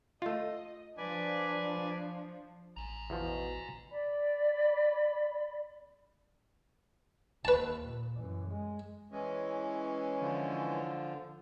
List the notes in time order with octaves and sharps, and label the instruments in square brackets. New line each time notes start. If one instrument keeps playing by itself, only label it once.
[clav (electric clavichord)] A3 F4 [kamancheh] D#5
[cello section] F3 [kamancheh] D4 [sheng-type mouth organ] B4 D5 G#5
[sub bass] A1 [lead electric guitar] G#5 A#5
[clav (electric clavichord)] E2 F3 [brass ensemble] B2
[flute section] D5 B5
[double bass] D#2 [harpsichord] B4 A5
[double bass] A#2
F#2 E3
G#3
[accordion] E3 G#3 C#4
[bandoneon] D3 F3